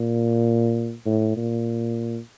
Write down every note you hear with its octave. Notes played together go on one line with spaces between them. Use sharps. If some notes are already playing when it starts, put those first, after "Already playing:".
Already playing: A#2
A2
A#2